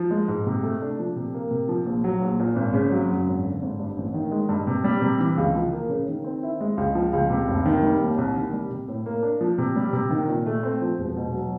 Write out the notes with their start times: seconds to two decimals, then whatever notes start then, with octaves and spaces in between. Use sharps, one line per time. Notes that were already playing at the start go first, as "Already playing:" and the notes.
Already playing: F3
0.11 G#3
0.28 G#2
0.47 C3
0.63 A3
0.82 D4
0.99 F3
1.16 C3
1.34 A#3
1.51 C3
1.69 F3
1.86 A#1
2.04 F#3
2.21 A#1
2.39 A#2
2.56 G#1
2.73 C#3
2.92 F#3
3.09 F#2
3.27 G#1
3.45 D3
3.62 G#1
3.79 G2
3.97 A1
4.14 D#3
4.31 G#3
4.49 G2
4.67 C3
4.84 G3
5.02 C3
5.20 E3
5.37 C#2
5.55 F3
5.73 A#3
5.89 C#3
6.08 D#3
6.24 C4
6.43 E4
6.61 G#3
6.77 C#2
6.95 F3
7.13 C#2
7.30 C3
7.48 F1
7.65 D#3
7.83 G3
8.00 D#2
8.18 C2
8.36 D#3
8.53 G3
8.71 C3
8.88 A2
9.06 A#3
9.23 D4
9.41 F3
9.58 C3
9.76 G3
9.93 C3
10.10 D#3
10.28 A#2
10.46 A3
10.63 C4
10.82 F3
10.98 E1
11.16 B2
11.34 F#3